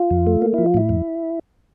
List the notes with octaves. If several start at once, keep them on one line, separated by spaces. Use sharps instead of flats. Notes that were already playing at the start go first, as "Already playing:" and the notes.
Already playing: F4
F2
A3
A#3
F3 E4
F4
A2 E4
F2